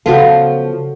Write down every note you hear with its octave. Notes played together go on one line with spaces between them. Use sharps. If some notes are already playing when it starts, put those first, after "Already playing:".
C#3 F3 B3 F4 F#4 A4